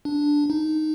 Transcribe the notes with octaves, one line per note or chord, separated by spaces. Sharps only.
D4
D#4